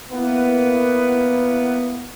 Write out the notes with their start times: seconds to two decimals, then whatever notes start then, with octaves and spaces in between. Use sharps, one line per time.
0.12 A#3 B3 E4 B4